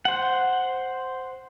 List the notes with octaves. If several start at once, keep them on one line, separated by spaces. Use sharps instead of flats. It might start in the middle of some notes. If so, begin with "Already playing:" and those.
C5 F#5